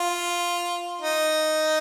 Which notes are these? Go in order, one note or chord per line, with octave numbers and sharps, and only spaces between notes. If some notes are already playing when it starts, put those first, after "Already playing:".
Already playing: F4
D#4